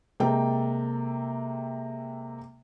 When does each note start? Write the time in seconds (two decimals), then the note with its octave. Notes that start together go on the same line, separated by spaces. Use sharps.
0.20 C3 G#3 A#3 A4 G5